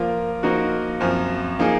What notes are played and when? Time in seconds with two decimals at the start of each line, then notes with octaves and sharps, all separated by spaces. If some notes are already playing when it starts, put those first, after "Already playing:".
Already playing: F3 A#3 F4 A#4
0.43 F3 A#3 D#4 F#4
1.00 F#2 F3 C4
1.59 F3 A#3 D#4 G#4